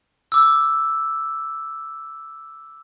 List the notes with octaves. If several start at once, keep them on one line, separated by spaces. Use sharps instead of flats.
D6 E6